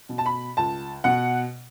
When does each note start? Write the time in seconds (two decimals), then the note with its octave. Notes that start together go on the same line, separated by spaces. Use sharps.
0.09 B2
0.18 A5
0.26 B5
0.57 C#2 A5
1.04 B2 F#5